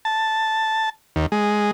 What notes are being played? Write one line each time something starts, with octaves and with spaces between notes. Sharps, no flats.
A5
D#2
G#3